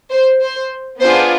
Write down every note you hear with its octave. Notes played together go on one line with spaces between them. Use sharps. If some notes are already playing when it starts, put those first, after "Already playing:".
C5
C5
B3 D4 F4 G#4 C5